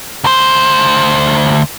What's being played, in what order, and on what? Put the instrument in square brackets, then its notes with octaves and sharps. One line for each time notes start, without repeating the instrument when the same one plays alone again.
[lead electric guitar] D2 C5